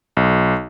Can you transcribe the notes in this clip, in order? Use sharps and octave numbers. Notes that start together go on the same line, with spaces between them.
B1